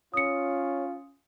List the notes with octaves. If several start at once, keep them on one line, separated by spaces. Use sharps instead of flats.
C#4 F4 C#5 D#6 C#7